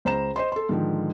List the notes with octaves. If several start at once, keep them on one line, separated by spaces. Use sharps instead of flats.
C#2 C5 A#5 E7
C5 D#5 C6
A4 C6
G#2 D3 D#3 F3